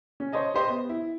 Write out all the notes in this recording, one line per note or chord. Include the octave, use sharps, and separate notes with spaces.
C#4
C5 C#5 D#5 A5
G4 C5 D#5
B3
E4